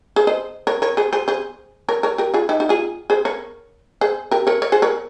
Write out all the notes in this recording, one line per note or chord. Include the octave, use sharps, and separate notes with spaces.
G#4 C5
C5 D#5
A#4 C#5
A#4 C#5
G#4 C5
G#4 C5
G#4 C5
A#4 C#5
A#4 C#5
G4 A#4
F4 G#4
D#4 G4
D#4 G4
F4 G#4
G#4 C5
A#4 C#5
G#4 C5
G4 A#4
A#4 C#5
A#4 C#5
G#4 C5
A#4 C#5